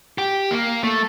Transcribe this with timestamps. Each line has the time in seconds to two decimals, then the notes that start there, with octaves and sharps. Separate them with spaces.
0.18 G4
0.51 A#3
0.84 A3